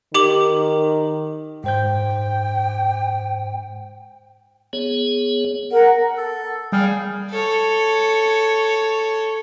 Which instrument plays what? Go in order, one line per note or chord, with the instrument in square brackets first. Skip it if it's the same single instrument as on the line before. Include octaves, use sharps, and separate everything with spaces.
[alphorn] D#3 [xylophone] G4 D6 F#7
[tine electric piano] G#2 C5 G6 [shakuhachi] G5
[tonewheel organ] B3 G#4 C#5
[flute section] A#4 F#5
[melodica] A4
[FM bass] G3 [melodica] G#4 F5 G5
[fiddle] A4 C#5